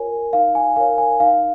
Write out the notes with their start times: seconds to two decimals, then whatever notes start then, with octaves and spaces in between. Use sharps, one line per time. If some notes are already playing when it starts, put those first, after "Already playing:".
Already playing: F4 A#4 C#5 G#5
0.33 D#4 F5
0.55 G#5
0.76 A#4 C#5 F5
0.98 G#5
1.20 D#4 F5